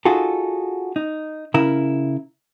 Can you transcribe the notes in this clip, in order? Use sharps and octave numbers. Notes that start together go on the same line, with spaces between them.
D#4 F4 F#4 G#4 A4
D#4
C#3 E4 A#4